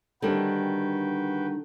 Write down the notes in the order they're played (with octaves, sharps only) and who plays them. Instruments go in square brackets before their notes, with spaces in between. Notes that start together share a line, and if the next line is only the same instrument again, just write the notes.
[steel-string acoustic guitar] D3 [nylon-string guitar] D#3 G3 C4 [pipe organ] F#4 B4 G5